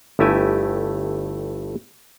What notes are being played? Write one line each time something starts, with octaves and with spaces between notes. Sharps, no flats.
G1 G2 A3 E4 G4 G#5